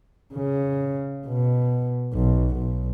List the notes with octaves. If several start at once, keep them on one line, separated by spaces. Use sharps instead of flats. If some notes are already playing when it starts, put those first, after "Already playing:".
C#3
B2
B1
B1